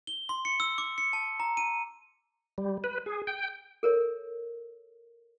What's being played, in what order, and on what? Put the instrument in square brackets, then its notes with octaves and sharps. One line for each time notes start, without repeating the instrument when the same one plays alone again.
[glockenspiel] G7
C6
C#7
E6
D6
C#7
A5
A#5
D#7
[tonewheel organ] G3
B4
G#4
G5
[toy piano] A4 A#4 C#5